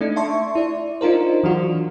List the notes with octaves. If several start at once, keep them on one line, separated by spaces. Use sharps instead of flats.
A3 D4 D#4
E5 A5 C6 C#6
E4 D5
D4 D#4 F4 A#4 C5
E3 F#3 D4 F4 F#4